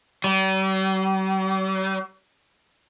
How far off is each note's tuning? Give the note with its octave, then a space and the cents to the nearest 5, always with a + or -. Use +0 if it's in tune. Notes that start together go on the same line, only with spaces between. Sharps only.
G3 -45